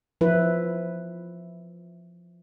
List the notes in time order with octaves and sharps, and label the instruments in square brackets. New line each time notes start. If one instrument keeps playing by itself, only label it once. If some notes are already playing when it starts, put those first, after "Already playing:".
[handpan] F3 E4 B4